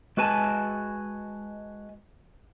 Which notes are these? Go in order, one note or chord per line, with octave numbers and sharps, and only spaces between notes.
G#3 F#4 B4 G#5 A5